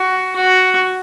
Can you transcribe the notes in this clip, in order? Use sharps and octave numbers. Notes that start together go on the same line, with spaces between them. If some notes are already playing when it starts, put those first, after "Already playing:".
Already playing: F#4
F#4